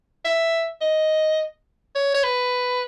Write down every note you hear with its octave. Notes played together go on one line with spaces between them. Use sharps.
E5
D#5
C#5
C#5
B4